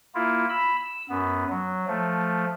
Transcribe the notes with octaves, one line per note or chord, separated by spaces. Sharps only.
A#3 E4 F4
B5 E6
E6
F#2 B3
F#3
F3 A3